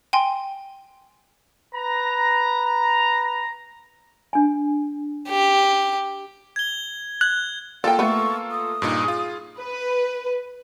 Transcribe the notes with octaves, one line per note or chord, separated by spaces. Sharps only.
G5 G#5 C6
B4 A#5
D4 G#5
G4
G#6 G7
F#6 G#6
A#3 F4 A4 D5 F#5 G5
A3 B3 C#6
D#6
G2 A#2 D#4
F4 G#4
B4